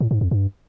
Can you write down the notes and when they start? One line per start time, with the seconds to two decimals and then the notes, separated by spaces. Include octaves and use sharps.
0.01 A2
0.11 G#2
0.21 F2
0.31 G2